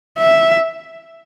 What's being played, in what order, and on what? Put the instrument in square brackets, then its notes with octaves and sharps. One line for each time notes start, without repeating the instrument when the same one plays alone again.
[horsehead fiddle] E5